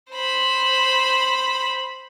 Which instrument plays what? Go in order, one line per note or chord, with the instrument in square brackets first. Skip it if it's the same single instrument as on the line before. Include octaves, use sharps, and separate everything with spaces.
[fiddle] C5 B5